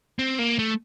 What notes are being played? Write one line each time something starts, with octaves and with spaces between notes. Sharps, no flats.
C4
A#3
A3